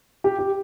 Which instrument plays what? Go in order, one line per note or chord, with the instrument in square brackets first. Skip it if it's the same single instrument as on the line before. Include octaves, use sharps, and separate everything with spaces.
[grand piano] G4
G4